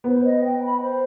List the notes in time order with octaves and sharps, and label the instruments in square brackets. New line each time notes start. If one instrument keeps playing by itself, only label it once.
[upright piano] B3 [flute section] C5
[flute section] D#5
G5
B5
C5